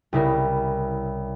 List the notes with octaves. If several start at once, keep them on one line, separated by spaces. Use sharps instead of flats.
C2 C#3 E4 A#4